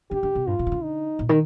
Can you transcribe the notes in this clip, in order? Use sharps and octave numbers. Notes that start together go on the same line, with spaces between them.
D3 G4
D3
C3
G2 F4
A#2
C3
D3
D#4
A#2
D#3